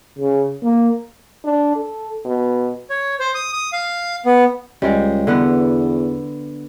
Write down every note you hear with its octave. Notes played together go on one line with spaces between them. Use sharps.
C#3
A#3
D4
A4
B2
C#5
C5
D#6
D#6
F5
B3
C#2 G3 G#3
E2 D3 B3 F#5